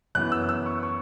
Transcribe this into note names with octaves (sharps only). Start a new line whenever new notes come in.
F#2 E3 B3 F#6
E6
E6
C#6
C#6